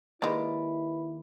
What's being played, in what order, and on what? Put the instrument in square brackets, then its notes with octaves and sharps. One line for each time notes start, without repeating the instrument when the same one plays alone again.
[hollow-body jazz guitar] D#2 A#3 D5 [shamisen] G#3 D#4 [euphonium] E4 [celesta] B4 B5